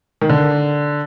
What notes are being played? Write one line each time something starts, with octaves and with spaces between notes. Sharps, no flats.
D#3
D3